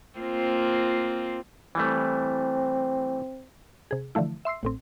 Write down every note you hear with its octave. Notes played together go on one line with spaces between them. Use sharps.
A#3 C4 F4
E3 G3 A3 C4
C3 G#4
D3 E3 F3 A3 E4
E5 C6 E6 C7
A1 A2 C4